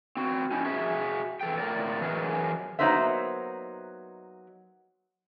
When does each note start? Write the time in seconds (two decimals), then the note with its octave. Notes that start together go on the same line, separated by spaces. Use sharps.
0.17 C4 F#4
0.51 C#4 D#4 E4
0.65 F#4 G#4 E5
1.41 E3 A4 G5
1.58 A2 A#4 D5
2.01 E3 F#3 G#4 A#4 D#5
2.79 F#3 A#3 B3 D#4 C5 E5